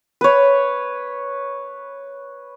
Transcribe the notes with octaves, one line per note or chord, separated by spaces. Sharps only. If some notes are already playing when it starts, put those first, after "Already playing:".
B4 C#5